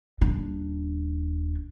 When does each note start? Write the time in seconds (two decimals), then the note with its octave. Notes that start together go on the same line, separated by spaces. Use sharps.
0.21 D#1 D4